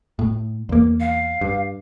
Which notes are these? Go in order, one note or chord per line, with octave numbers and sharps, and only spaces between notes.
A2
E2 A#3
F5
G2